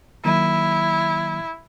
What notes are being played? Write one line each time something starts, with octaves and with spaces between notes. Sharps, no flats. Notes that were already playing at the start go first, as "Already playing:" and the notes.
D#3 F#3 A#3 E4